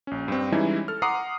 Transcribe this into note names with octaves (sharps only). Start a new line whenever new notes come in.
A#1 C#4
G2 C4
E3 G3 G#3 C#4 D#4 E4
A4 F6
F#5 A#5 C6 D6 D#6 C7